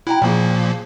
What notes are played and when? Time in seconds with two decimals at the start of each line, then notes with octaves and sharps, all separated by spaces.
0.07 E4 F#4 G5 A#5
0.22 A#2 C#3 F3 A#3 F5